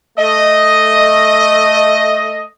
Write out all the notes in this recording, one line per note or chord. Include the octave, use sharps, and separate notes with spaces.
A3 D#5